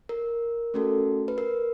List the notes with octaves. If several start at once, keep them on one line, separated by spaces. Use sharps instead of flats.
A#4
A3 C#4 F#4 A4
B4
A#4